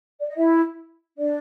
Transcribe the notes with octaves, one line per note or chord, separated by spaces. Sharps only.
D5
D#5
E4 E5
D4 D5